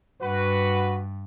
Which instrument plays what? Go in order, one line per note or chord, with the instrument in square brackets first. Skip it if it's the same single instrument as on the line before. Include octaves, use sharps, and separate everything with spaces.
[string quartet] G2 [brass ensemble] F#4 B4